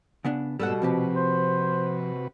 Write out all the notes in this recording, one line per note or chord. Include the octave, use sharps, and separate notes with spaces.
C#3 B3 D4
G#2 B2 G3 B3 A4 F#5 E6
C3 F3 C4 F#4 G4 B4
C5